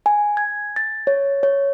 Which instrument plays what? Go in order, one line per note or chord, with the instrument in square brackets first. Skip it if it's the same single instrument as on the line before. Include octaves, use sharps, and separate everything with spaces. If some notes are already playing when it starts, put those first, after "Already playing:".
[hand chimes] G#5
G#6
A6
C#5
C#5